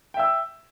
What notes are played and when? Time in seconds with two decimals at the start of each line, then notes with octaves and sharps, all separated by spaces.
0.14 G5
0.17 E5
0.19 E6